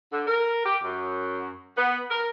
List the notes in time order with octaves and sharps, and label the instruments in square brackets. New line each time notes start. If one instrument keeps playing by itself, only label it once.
[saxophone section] D3
A#4
G4
F#2
B3
A#4